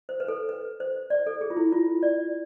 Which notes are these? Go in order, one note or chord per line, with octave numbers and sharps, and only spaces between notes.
C5
B4
A4
B4
C5
D5
A4
G#4
F4
E4
F4
D5